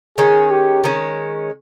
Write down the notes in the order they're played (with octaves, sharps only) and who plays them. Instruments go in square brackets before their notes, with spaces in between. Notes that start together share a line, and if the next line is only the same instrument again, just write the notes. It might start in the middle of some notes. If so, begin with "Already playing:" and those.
[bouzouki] D#3 G#3 C#4 [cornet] G#4
[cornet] G4
[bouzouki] D#3 G#3 C#4